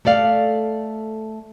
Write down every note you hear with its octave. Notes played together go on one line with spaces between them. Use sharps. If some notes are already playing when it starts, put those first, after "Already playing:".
A3 A4 D5 F5